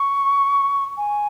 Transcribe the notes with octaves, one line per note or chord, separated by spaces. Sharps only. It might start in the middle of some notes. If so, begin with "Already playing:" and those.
Already playing: C#6
G#5